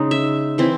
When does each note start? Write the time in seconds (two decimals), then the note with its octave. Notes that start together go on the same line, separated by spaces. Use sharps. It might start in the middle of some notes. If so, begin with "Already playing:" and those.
Already playing: C#3 G#3 D#4
0.11 E5
0.58 E3 C4 E4